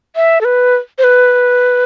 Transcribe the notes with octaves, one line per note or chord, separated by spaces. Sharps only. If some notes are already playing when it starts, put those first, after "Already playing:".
E5
A4
B4
C5
B4